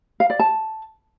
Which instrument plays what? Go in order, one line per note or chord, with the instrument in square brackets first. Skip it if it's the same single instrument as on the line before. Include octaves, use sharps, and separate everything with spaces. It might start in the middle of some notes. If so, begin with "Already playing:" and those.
[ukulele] F5
D5
A5